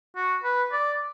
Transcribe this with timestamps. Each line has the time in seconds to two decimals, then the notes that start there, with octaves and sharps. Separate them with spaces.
0.16 F#4
0.44 B4
0.72 D5